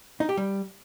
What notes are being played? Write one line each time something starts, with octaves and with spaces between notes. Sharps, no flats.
D#4
G4
G3